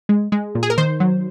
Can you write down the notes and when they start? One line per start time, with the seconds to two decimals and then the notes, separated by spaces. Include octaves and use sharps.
0.09 G#3
0.32 G#3
0.55 A#2
0.63 G#4
0.70 A#4
0.78 D#3 C5
1.00 F#3